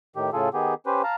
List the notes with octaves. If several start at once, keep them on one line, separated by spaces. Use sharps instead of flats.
A2 D#3 G4
A2 C#3 F4 G#4 A4
D#3 B3 G4 G#4
C#4 G4 B4 C5
F5 A5 A#5